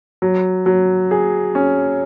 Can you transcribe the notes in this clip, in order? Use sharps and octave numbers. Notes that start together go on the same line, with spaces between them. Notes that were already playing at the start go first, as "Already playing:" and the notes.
F#3
F#3
G#4
C#4